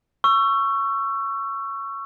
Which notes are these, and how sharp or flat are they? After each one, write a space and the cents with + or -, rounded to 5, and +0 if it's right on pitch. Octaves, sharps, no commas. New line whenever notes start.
C#6 +0 E6 +30